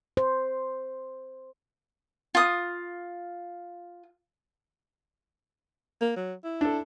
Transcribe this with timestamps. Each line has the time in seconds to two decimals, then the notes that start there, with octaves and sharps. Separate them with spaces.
0.17 C5
2.35 F4 D#6
6.01 A#3
6.16 F#3
6.44 E4
6.61 D4 A4